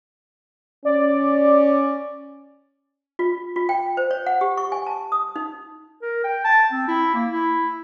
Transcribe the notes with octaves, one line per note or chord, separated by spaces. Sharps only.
C#4 D5
F4
F4
G5
C5
C#5
F#5
G4
C#6
G#5
A5
D#6
D#4
A#4
G5
A5
C4
E4
A#3
E4